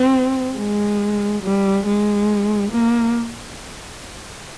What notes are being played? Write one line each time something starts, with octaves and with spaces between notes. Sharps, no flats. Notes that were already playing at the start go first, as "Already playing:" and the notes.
Already playing: C4
G#3
G3
G#3
A#3